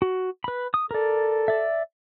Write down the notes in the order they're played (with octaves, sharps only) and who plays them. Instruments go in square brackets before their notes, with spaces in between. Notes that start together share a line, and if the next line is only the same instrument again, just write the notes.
[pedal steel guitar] F#4
B4 B5
D#6
[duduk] A4 [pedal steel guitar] A#4 D5
[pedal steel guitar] D5 E5